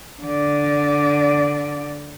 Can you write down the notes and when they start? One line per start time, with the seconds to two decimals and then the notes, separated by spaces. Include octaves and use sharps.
0.23 D3 D5